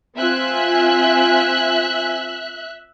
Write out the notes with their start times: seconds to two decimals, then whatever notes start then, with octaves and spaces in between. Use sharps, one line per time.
0.18 C4 F4 E5 G#5 F#6